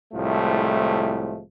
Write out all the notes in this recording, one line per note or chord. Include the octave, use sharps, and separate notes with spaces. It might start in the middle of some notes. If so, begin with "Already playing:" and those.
C2 A2 F3 G#3 A3